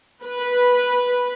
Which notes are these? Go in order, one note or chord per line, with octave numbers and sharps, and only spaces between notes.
B4